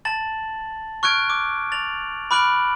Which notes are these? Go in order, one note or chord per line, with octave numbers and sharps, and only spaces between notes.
A5 A6 F#7
C#6 F6 F#6 G#6 D7
D6
A6 F7 F#7
B5 D6 F6 F#6 D7 F#7